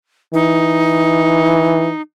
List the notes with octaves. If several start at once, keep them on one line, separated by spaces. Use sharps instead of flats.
E3 D#4